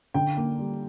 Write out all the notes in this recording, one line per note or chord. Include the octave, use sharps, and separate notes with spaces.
D3 G5
A#3
G3